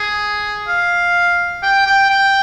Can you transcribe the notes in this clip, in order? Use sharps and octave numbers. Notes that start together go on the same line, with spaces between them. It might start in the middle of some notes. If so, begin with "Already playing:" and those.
Already playing: G#4
F5
G5
G5
G5